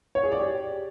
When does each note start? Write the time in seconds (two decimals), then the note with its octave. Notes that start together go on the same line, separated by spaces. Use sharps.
0.15 C#5
0.23 G#4
0.32 D5
0.40 G4